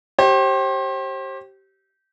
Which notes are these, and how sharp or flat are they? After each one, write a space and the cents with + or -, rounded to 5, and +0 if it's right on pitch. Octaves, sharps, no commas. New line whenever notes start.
G4 -20 C5 +35